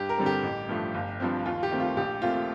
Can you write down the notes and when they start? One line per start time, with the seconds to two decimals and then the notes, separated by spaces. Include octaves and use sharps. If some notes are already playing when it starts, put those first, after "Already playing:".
Already playing: G2 G4
0.09 A#4
0.18 D3 G3 C4
0.26 G4
0.43 A1
0.69 G2 F3 A3
0.94 G1
1.20 G2 F3 C4
1.46 D#2 F4
1.63 G4
1.71 D#3 A3 C4
1.80 F4
1.96 A#1 G4
2.22 A#2 A3 C4 F4